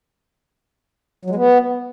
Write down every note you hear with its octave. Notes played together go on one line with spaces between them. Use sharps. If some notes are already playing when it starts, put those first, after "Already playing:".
F#3
G#3
B3